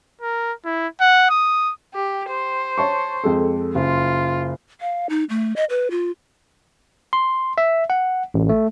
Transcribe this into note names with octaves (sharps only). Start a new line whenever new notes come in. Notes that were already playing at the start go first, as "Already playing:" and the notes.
A#4
E4
F#5
D#6
G4
C5
C#5 A5 C#6
F2 G#3 A4
F#1 F4
F5
D#4
A3
D#5
B4
F4
C6
E5
F#5
A1
A3